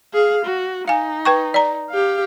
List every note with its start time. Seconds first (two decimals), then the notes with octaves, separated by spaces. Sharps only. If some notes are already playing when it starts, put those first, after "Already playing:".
0.14 G#4 F5
0.45 F#4
0.88 D#4 F5 G#5
1.25 B4 G5 C#6
1.54 D5 A#5
1.90 G4 F5